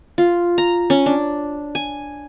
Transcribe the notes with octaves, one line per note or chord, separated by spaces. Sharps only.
F4
A#5
C#4
D4
G#5